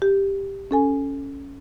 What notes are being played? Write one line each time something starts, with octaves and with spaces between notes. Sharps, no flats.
G4
C#4 A4 G#5